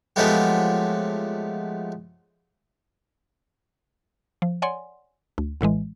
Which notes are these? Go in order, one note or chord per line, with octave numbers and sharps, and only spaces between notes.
F3 F#3 G#3 A3 B3 G4
F3
C#5 D5 F#5 G#5 C6
D2
A#1 A2 E3 G#3